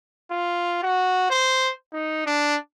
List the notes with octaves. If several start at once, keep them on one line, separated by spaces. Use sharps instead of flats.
F4
F#4
C5
D#4
D4